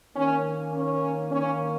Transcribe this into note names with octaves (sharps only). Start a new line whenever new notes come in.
D#3 A#3 C#4
C#4
D#3 A#3 C#4